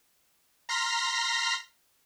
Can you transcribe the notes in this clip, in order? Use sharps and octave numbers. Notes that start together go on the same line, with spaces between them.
A#5 C6 F6 A#6 B6